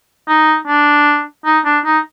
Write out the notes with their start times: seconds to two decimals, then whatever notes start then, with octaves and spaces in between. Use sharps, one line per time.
0.29 D#4
0.68 D4
1.46 D#4
1.65 D4
1.85 D#4